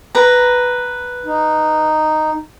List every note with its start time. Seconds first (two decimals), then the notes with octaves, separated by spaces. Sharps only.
0.15 B4 A#5
1.26 D#4